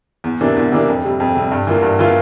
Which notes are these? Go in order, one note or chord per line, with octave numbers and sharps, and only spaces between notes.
E2
C3 E3 A#3 D4
E2
C3 E3 A#3 D4
F2
C3 G3
F2
C3 G3
G2
E3 A#3 F4
G2
E3 A#3 F4